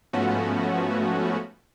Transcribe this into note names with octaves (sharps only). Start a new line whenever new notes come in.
G#2 F3 A3 B3 C#4 F#4